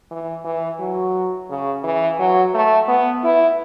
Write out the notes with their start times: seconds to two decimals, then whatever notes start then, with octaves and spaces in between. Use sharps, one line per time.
0.11 E3
0.45 E3
0.80 F#3
1.50 C#3
1.84 E3
2.19 F#3
2.54 A3
2.88 B3
3.24 E4